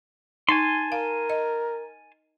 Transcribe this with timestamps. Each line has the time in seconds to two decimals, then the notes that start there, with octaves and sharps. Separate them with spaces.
0.49 D#4 G#5 A5 C6
0.92 A#4 F5
1.30 D#5